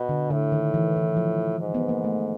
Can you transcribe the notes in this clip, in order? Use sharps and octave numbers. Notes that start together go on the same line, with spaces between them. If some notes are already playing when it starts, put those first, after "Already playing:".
Already playing: B2
D3
A2 D3
D#3
E3
E3
F3
G#2
B3
A#3
A3